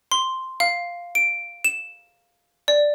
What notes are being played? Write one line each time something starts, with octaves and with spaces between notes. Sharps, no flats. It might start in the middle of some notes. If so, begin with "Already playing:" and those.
C6
F5
D7
E7
D5